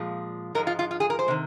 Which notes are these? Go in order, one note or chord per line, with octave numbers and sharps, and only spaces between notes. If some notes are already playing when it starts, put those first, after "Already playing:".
Already playing: A#2 F3 G#3
G#2 F3 G#3 A#4
F4
F4
F4
G#4
A#4
C5
C3 D#3